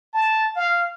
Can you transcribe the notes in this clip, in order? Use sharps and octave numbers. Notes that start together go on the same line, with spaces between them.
A5
F5